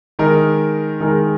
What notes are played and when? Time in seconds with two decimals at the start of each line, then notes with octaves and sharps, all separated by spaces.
0.19 D#3 G#3 D#4 A#4
1.00 D#3 G#3 D#4 A#4